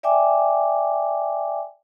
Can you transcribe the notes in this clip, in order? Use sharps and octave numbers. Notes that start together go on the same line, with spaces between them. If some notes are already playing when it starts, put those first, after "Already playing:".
D5 E5 G5 G#5 D6